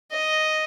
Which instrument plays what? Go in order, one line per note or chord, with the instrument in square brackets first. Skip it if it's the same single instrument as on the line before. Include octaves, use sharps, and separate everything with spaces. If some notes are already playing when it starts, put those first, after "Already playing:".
[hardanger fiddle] D#5